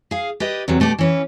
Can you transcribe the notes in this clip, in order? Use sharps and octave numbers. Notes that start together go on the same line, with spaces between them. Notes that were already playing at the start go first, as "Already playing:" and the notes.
G#4 F5
G4 B4 D5 D#5
E2 C3 F#3
B2 A3 G4 D5
E3 C#4 B4